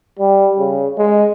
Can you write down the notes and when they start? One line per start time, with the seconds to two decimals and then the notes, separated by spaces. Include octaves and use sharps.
0.19 G3
0.59 C#3
0.98 G#3